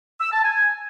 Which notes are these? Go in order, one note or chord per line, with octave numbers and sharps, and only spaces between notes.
E6
A5
G#5